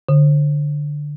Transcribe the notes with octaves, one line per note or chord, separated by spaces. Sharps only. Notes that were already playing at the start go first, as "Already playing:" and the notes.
D3